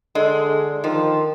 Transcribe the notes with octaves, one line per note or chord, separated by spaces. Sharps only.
D3 G#3
D#3 F3